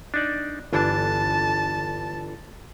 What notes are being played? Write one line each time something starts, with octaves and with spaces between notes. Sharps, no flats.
D4 D#4 D5
G1 E3 D4 A5